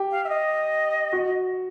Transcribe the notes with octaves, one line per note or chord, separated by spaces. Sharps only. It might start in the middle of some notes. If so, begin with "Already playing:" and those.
Already playing: G4
F5
E5
D#5
F#4